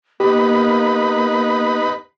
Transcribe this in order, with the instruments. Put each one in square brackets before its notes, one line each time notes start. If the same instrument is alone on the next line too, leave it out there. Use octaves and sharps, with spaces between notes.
[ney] A#3 [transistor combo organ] B3 D#4 B4 [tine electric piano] G4